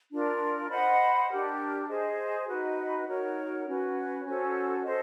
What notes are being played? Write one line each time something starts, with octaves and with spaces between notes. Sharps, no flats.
D4 F4 A#4 D5
C5 D#5 F#5 B5
D4 G4 A#4
G#4 C5 D#5
D#4 F#4 B4 D#5
D#4 F#4 A#4 C#5
C#4 F#4 B4
C#4 F#4 A4 C5
A4 C5 D#5